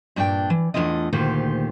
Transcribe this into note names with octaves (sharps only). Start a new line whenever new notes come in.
G2 A#2 D4 C#5 G5
E3
E2 A2 A3 D4 F4 D#5
D2 A#2 D#3 G4 C5